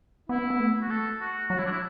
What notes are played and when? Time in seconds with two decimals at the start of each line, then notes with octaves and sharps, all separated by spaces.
0.29 B3 E4
0.50 B3
0.60 A3
0.82 F#4
0.90 A4
1.20 F#4
1.50 F#3 F#4
1.58 E4
1.65 D4
1.72 E4